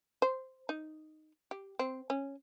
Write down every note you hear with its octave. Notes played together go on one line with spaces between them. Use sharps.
C5
D#4
G4
C4
C#4